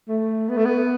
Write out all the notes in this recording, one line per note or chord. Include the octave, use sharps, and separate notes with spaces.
A3
B3
A3
B3